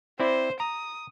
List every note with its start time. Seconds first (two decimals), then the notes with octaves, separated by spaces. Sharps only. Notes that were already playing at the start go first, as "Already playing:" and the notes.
0.20 C4 E4 C5 D5
0.60 A#5 D#6